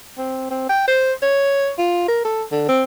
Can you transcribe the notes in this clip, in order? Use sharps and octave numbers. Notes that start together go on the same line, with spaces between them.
C4
C4
G5
C5
C#5
F4
A#4
A4
D3
C4